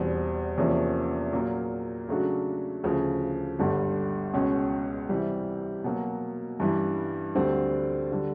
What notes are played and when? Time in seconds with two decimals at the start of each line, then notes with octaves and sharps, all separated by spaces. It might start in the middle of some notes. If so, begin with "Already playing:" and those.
Already playing: E2 B2 G3 C4
0.58 E2 C3 F3 A#3 C#4
1.33 A#2 F#3 A#3
2.08 C#3 F#3 A3 D4 F#4
2.83 D2 C#3 F3
3.59 G1 G2 D3 G3
4.34 C#2 B2 G#3 C#4
5.09 C3 E3 G3
5.84 B2 F#3 A#3
6.60 G2 E3 G3
7.35 D2 D3 G3 C4
8.12 D3 G3